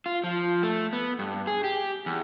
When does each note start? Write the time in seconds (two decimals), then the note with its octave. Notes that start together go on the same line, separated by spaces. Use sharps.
0.06 F4
0.24 F3
0.63 A3
0.93 B3
1.19 G2
1.47 G#4
1.64 G4
2.06 E2